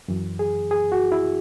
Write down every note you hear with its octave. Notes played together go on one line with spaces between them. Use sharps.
F#2 E3
G#4
G#4
F#4
E4